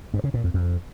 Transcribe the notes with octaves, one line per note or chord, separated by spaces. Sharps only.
G2
C#3
A#2
F2
F2